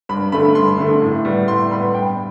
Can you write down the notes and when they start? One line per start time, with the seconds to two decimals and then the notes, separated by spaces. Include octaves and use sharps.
0.09 G2 B5
0.32 D3 A3 B5
0.55 G2 C6
0.78 D3 A3
1.02 A2
1.25 G3 B3
1.48 A2 C6
1.71 G3 B3 B5
1.94 G2 G5